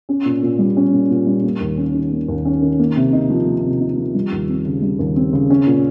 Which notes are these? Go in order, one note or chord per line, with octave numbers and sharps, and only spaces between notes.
C#4
A#2
A#2
G3
C#4
A#2
A#2
G3
A#3
D#2
C#4
D#3
A#3
D#2
C#4
D#3
A#3
C3
D#4
F3
A#3
C3
D#4
F3
G3
D#2
C4
C#3
G3
D#2
C4
C#3
C#4
A#2